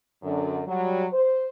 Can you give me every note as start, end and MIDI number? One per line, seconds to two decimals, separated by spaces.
0.22 0.60 42
0.22 0.60 50
0.67 1.04 54
0.67 1.04 55
1.12 1.48 72